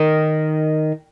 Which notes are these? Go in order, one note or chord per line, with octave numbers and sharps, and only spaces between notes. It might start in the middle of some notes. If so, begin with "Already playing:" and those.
Already playing: D#3